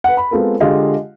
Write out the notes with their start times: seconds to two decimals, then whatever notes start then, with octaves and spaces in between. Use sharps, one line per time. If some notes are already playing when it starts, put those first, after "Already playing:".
0.04 B4 F#5
0.17 B5
0.31 G#3 B3 C4 F4 A4 A#4
0.60 D3 G#3 F4 G4 D#5 F5